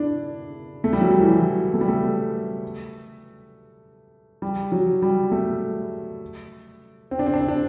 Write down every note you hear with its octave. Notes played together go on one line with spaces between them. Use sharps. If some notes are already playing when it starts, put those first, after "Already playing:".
Already playing: D4 E4
A3
G3
F#3
G3
E3
F#3
A3
G3
A3
G3
F#3
G3
A3
C4
D4
C4
D4
C4
D4